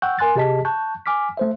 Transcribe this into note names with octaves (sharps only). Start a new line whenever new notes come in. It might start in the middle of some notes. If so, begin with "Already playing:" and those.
F#5 G5 C#6 E6 F#6 G6
A#4 G#5 C6 F#6 A6
C3 G4 G#4 D#5 A5 B6
A5 C#6 F#6 G6
G#5 D6 F6 B6
A3 C5 E5